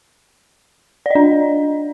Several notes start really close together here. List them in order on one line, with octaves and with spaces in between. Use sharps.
D5 D#5 D4